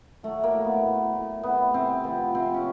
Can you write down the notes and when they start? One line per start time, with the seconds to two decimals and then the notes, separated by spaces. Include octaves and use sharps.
0.23 F#3 A3
0.44 A#3
0.53 A2
0.65 B3
0.84 A2
1.14 A2
1.43 C3 B3
1.74 C3 C4
2.04 F3 B3
2.35 C3 C4
2.54 C#4